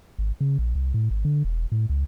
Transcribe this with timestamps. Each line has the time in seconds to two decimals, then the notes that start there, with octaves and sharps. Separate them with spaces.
0.19 G#1
0.41 C#3
0.59 A#1
0.75 C2
0.94 A2
1.10 G#1
1.25 D3
1.44 E1
1.72 A2
1.89 C#2